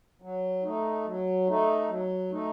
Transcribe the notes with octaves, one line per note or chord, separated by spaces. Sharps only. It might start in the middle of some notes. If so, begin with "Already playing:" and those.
F#3
A3 D#4
F#3
A3 D#4
F#3
A3 D#4